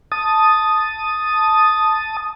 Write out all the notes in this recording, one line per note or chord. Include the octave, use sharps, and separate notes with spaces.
A5 D#6